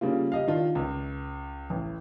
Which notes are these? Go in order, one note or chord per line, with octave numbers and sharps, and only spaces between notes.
C#3 G3 A#3 F4
G4 D#5 F5
D#3 D4 F4
C#2
A1